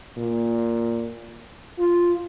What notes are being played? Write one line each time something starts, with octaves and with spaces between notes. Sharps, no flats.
A#2
F4